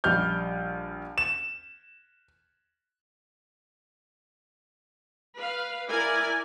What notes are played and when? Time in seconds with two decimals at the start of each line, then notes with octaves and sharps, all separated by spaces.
0.04 A#1 G3 D#5 F6 G6
1.18 E7
5.36 B4 F5
5.89 E4 A#4 D5 G#5